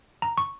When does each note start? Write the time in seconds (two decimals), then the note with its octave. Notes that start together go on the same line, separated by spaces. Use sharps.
0.22 A#5
0.38 C#6